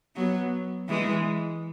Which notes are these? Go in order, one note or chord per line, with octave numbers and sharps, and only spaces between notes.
F#3 B3
E3 G#3